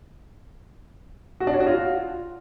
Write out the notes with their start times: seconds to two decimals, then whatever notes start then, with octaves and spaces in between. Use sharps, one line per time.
1.40 F#4
1.47 D4
1.54 C#5
1.60 F#4
1.67 F4